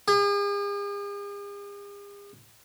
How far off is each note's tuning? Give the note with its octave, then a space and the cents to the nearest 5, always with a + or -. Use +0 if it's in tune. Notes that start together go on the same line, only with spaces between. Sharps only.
G#4 -45